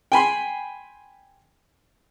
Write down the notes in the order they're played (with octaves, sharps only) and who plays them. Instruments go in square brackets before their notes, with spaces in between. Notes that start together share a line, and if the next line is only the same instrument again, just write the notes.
[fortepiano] G5 G#5 B5 C6